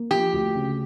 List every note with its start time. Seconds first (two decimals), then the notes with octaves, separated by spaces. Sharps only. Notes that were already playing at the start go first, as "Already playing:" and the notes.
Already playing: A#3
0.11 F3 G4
0.33 D2
0.55 C#3